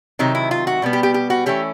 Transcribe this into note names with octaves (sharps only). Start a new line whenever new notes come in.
C3 D#3 F#3 D#4
E4
F4
F#4
B2 G3 B3
G4
G4
G4
F#4
E3 A3 C#4 G4